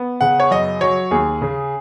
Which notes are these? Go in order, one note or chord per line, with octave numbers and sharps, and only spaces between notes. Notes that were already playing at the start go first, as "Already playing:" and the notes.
Already playing: B3
C#3 F#5
C#5
F#2 D#5
F#3 C#5
D#2 G#4
C#3